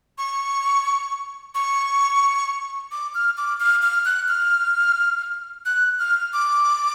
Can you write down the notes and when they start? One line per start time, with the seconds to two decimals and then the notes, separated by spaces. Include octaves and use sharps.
0.18 C#6
1.55 C#6
2.92 D6
3.15 F6
3.38 D6
3.60 F6
3.82 F6
4.05 F#6
4.28 F6
5.66 F#6
5.99 F6
6.33 D6